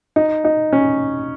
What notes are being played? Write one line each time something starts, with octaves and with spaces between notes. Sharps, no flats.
D#4
D#4
C#4